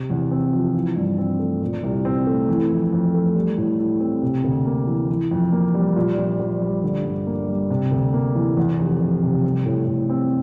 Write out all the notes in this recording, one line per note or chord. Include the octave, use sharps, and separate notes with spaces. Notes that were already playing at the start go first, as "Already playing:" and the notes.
Already playing: C3
E2
C4
F3
E3
G2
C4
A3
A#2
C2
C4
A3
E3
F2
F2
A3
G3
A2
E4
C4
C3
D2
A#3
E3
E3
F2
A#3
G3
A#2
A#1
A#1
G3
D3
G2
A#3
G3
C3
D2
A#3
E3
E2
F1
F1
C3
G3
A2
A2
C4